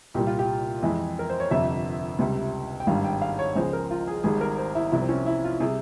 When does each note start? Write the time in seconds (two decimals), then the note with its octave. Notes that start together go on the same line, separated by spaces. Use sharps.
0.14 C2 A#2 G3 G4
0.27 F4
0.39 G4
0.83 F2 E3 G#3
1.19 A#4
1.30 C5
1.40 C#5
1.51 G1 F2 C3 E5
2.19 C#2 C3 G3
2.80 G5
2.87 G#1 G2 G3 F5
3.04 G5
3.22 F5
3.39 C#5
3.55 C#2 C#3 F3 G#3 C5
3.73 A#4
3.90 F4
4.07 G#4
4.23 G#1 G#2 G3 G#4
4.41 A#4
4.58 C5
4.75 E4
4.92 C2 C3 F3 E4
5.01 C4
5.09 C#4
5.26 E4
5.44 F4
5.60 C3 G3 G#4